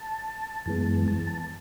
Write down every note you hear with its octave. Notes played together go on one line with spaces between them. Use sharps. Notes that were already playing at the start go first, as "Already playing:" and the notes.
Already playing: A5
F#2 E3 G#3 B3 A5
A5
A5
A5